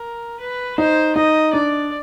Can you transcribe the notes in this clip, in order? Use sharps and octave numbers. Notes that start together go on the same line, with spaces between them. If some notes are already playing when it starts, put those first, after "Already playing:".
Already playing: A#4
B4
D#4 C5
D#4 D#5
D4 D5